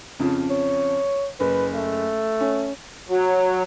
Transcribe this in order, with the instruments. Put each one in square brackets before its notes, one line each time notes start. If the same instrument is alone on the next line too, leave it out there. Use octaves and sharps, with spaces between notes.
[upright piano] F2 C#3 F3
[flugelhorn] C#5
[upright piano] F#1 [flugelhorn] B4
[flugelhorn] A3
[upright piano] C#4
[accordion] F#3